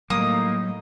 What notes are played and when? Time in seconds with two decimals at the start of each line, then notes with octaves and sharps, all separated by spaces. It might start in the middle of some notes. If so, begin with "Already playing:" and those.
0.10 A2 F#3 G3 A#3 D#4 D#6